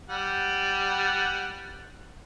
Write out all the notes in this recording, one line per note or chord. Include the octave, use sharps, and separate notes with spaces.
G3 F#5